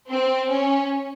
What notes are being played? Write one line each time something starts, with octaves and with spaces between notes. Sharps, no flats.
C4
C#4